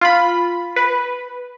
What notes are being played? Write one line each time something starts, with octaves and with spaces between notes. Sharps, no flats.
F4 B5
B4